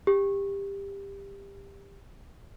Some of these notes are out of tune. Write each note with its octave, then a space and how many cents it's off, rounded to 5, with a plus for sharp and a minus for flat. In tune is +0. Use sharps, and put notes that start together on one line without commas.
G4 +20